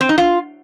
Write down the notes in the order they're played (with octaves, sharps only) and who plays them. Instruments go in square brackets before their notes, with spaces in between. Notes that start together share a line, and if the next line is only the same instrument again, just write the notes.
[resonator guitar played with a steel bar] C4
D#4
F4